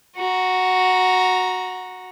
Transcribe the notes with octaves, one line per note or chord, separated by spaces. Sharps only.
F#4 A#5